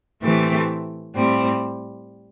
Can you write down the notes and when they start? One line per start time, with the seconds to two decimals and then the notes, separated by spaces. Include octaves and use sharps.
0.23 A2 E3 A3 C4 G4
1.15 A2 G3 C4